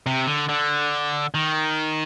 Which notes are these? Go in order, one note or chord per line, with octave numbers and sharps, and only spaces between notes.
C3
D3
D3
D#3